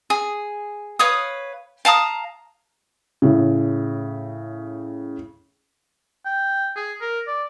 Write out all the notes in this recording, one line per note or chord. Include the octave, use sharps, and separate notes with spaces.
G#4
B4 C#5 F5 D#6
F5 A5 A#5 D#6
A2 C#3
G5
G#4
A#4
D5